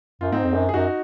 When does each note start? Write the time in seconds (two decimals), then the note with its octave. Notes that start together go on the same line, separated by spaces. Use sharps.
0.21 F#2 F4
0.32 G#2 C4 D#4
0.44 F2
0.54 F#2
0.69 G#4
0.74 F#2 D#4 F#4